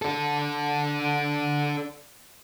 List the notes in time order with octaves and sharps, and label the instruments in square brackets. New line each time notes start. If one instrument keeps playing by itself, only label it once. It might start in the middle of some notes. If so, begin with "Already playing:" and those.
[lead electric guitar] D4 A4